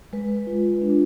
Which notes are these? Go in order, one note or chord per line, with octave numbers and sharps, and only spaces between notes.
G#3 B4
F4
D4